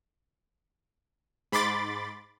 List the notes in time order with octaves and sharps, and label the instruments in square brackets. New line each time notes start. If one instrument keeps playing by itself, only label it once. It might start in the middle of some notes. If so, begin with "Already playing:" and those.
[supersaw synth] G#2 B5 C6 D6 A6